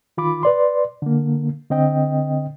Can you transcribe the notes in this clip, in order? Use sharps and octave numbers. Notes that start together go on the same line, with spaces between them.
D#3 F4 B5 D6
B4 D5 C6
D3 A#3
D3 C4 D#5 G5